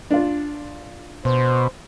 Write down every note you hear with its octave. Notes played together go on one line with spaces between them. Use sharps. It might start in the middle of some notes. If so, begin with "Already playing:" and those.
D4 F4
B2 C5